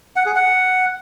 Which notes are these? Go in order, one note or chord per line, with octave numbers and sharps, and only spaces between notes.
F#5
G#4
F#5